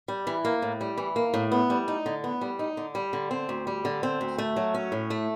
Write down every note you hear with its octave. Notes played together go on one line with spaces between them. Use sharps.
G3
E3
A#3
A2
G3
E3
A#3
A2
B3
G3
D#4
D3
B3
G3
D#4
D3
G3
D3
C4
D2
G3
D3
C4
D2
A3
F#3
C#4
A2
A3